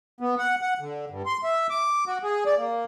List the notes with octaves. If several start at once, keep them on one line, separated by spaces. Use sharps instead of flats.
B3
F#5
F#5
D3
G2
C6
E5
D6
F#4
G#4
D5
A#3